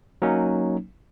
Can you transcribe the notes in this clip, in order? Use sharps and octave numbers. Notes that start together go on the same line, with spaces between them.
F#3 A#3 C#4 D#4